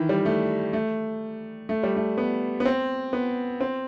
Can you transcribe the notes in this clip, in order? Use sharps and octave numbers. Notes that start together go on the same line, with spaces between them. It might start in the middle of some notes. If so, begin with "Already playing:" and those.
Already playing: D#3 E3
G3
A3
A3
A3
G3
A3
B3
B3
C4
B3
C4